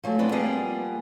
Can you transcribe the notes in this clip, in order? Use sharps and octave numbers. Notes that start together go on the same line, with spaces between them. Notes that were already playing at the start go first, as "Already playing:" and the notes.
F3 F#3 G#3 A3
B3 C4 D4 E4
F3 G3 A#3 B3 F4 G#4